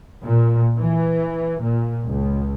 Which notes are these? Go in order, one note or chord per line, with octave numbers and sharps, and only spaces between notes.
A#2
E3
A#2
C#2